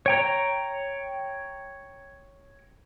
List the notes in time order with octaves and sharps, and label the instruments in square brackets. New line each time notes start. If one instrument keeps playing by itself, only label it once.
[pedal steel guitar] C#5 G5 A#5